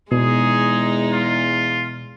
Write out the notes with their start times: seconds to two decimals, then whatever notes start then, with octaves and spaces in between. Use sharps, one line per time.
0.12 E2 B2 G#3 D#4 G#4
1.13 F4